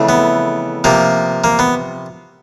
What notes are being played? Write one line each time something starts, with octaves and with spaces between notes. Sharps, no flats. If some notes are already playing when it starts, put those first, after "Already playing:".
Already playing: F2 C#3 E3 A3
B3
C3 F3 A#3
A#3
B3